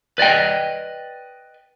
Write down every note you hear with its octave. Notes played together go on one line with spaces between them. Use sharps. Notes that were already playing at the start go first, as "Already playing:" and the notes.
B4 D5 D#5 G5